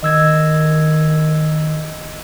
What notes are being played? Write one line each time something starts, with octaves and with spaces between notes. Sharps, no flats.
D#3 D#5 E6 G#6